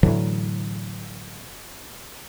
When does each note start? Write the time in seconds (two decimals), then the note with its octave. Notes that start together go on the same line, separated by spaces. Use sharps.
0.03 A2 D3 E3 F#3